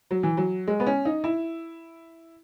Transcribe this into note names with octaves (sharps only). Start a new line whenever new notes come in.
F#3
E3
F#3
G#3
B3
C#4
D#4
E4